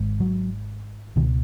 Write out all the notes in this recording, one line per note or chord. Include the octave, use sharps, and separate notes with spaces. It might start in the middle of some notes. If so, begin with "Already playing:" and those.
Already playing: G#1 G#2
F#3
C#2 B2 D#3